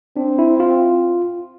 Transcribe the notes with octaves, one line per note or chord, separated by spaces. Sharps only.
C4 D4
E4
F4